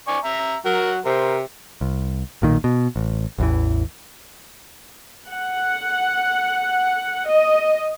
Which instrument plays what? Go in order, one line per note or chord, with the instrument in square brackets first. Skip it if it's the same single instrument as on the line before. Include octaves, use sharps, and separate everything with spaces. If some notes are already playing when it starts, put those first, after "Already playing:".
[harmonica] D5 G#5 C#6
E5 A#5
[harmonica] F#3 F#5 [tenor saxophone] A#4
[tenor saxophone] C3 [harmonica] A#4 C5
[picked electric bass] C2
B1 A#2 D#3
B2
A1
A1 E2 E3
[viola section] F#5
D#5